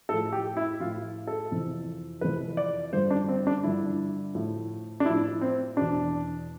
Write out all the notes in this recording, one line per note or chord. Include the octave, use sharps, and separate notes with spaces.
A2 F3 A4
G4
E4
A2 F3 F4
A4
F2 C3 E3
F2 C3 E3 B4
D5
G2 D3 F3 C5
D4
C4
D4
G2 D3 F3 E4
A2 F3
D4
A2 F3 E4
C4
E2 B2 D4